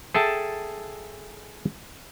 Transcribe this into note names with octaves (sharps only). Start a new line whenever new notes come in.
G#4 A4 E5 G5 A5